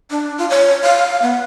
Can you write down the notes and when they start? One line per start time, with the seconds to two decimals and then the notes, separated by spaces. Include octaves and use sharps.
0.11 D4
0.38 F4
0.50 C#5
0.84 F5
1.22 B3